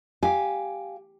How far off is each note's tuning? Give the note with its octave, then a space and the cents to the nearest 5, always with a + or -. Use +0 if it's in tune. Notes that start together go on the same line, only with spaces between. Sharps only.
G4 +0 F5 +0 G#5 +0